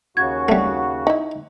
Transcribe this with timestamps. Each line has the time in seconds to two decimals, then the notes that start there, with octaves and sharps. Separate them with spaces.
0.17 D#2 C#3 F#4 G#6
0.49 G3 A3
1.07 D#4 E4